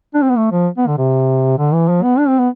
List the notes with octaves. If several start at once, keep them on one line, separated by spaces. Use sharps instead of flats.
D4
C4
B3
A3
F3
B3
D3
C3
D3
E3
F3
B3
D4
C4
B3